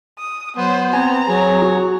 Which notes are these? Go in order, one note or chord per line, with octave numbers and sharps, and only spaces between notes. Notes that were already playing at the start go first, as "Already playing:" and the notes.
D#6
F#3 B3 C5
C4 G#5 A#5
F#3 G#4
F#4